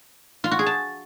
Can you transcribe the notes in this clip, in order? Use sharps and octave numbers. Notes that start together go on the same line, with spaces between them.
F4
F#4
G#4
A5